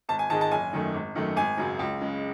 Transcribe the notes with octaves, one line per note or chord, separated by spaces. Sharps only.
G#1 A5
G#5
G#2 D#3 G#3 A5
A5
F#1 G#5
F#2 D#3 A3
G#1
F#2 D#3 A3
G#1 G#5
F#2 C#3 F#3
C#2
C#3 G#3